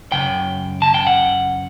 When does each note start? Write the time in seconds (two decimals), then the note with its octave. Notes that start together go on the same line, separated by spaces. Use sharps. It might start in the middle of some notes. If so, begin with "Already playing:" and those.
0.12 F#2 C#3 G5
0.82 A5
0.94 G5
1.07 F#5